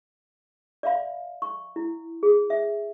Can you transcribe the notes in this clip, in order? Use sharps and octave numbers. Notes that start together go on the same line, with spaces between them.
D5 E5 F5 B5
C#6
E4
G#4
E5